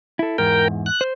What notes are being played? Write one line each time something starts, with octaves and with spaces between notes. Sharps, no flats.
E4 A4
E2 G#2 A#4 G5
F#6
C5